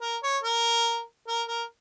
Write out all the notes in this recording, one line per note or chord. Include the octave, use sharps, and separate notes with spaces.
A#4
C#5
A#4
A#4
A#4